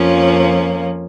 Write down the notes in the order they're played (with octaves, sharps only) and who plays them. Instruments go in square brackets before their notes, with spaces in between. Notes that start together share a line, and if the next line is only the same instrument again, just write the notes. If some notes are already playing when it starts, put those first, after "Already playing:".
Already playing: [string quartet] F2 F3 A#3 C#4